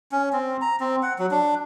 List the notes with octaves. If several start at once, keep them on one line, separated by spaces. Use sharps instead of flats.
C#4
C4
A#5
C4
F#5
F#3
D4